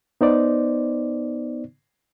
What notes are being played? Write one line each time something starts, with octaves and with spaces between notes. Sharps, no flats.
B3 D#4 C5 D5